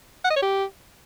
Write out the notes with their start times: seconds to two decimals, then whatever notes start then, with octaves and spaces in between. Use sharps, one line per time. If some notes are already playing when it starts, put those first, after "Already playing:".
0.25 F#5
0.30 D#5
0.36 C#5
0.42 G4